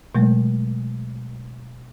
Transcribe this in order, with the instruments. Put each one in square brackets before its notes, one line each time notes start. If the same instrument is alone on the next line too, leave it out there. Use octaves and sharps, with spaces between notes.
[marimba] B2 F#3 G#3 A3